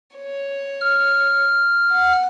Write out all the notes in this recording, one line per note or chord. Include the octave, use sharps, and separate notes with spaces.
C#5
F6
F#5